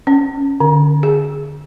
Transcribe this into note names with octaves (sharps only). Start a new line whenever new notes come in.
C#4
D3
G#4